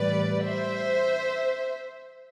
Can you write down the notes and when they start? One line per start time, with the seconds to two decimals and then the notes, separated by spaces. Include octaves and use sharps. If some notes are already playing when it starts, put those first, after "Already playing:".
Already playing: A2 E3 G3 B4 D5
0.45 C5 E5